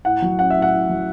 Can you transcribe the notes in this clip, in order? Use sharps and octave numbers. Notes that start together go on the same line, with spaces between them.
A2 F#5
F#3
C#4 F#5
E5
A2
F#5
A2
F#3